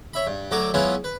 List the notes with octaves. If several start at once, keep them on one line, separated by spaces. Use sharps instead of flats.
C#5 E5 B5
G2
D2 F#3 F#4 A4 A#5 D6
F#3 G#3 B3 C#4 E4 F4
B4